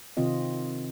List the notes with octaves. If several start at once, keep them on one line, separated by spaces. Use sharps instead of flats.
C3 D#3 C4 F4 D#5